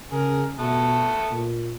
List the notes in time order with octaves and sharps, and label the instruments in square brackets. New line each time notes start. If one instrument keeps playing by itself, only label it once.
[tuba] C#3 [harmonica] G#4 A#4
[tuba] B2 [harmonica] A3 B3 A5
[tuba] A#2